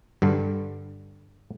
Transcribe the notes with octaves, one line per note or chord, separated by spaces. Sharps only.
G2 D3 G3